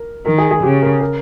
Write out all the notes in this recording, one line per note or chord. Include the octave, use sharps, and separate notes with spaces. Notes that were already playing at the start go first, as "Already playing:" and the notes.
Already playing: A#4
D#3 A#4
G#4
G#4
C#3 G4
A#4
A#4